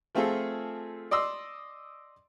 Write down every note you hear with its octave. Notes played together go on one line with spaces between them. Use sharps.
F3 A3 C4 F4 G#4 A4
D5 D#5 C6 E6